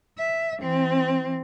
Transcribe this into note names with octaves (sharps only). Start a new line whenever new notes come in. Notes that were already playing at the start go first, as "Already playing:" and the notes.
E5
E3 C4